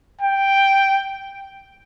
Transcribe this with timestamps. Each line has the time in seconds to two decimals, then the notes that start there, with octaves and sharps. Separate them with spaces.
0.21 G5